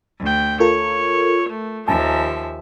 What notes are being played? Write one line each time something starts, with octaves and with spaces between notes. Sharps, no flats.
D2 G5
F4 A4 A#4 C#5
A3
D#2 F3 E5 G#5 A5